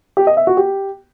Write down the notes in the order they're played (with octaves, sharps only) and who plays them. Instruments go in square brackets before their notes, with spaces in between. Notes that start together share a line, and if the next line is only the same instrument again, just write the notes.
[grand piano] G4
D#5
E5
F#4
G4